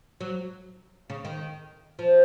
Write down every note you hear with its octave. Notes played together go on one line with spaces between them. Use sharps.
F#3
C#3
D#3
F3